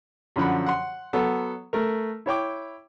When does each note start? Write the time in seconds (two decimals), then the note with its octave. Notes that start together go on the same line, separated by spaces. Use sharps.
0.36 F#2 D3 F3 F#5 B5
0.66 F#5 C6
1.13 F#3 B3 A4
1.73 A3 A#4
2.26 E4 C#5 G5 D6